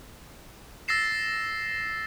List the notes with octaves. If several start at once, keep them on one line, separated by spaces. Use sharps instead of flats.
E6 A6 A#6 C7 E7